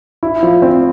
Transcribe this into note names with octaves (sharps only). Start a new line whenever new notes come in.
E4
F3
C4